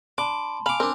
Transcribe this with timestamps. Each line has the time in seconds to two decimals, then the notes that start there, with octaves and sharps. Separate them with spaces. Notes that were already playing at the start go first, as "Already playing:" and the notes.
0.18 D4 A5 B5 C6 D6
0.66 F5 G#5 B5 D6 F7
0.80 C4 D4 A#4